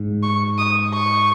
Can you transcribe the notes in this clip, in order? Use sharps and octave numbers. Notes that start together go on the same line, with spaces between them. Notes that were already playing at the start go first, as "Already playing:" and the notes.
Already playing: G#2
C#6
D#6
C#6